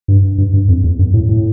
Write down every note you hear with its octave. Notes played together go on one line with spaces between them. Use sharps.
G2
G2
G2
F2
E2
F#2
A2
A2